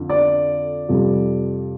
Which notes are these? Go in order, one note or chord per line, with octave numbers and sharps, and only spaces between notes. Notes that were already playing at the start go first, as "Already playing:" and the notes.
Already playing: F2 D3
D5
F2 C3 G3